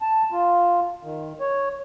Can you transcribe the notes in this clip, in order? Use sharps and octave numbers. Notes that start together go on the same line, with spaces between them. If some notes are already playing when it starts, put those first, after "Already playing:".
A5
F4
D#3
C#5